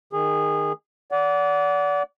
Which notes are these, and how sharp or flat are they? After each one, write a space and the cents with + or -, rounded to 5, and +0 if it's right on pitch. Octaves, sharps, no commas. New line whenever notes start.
D#3 -10 G#4 -20
D5 -30 F#5 +0